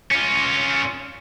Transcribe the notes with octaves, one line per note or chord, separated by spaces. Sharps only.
C#4 F4